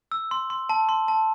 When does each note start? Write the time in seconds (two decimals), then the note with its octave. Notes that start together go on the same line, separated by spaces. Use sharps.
0.12 E6
0.31 C6
0.50 C6
0.69 A5
0.89 C6
1.08 A5